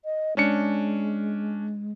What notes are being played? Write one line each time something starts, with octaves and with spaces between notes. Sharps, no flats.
D#5
G#3 C#4 D4 C#7